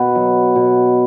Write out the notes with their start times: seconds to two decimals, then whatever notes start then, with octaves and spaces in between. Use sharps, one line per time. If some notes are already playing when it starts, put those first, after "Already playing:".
Already playing: B2 B4
0.15 F#3
0.55 B2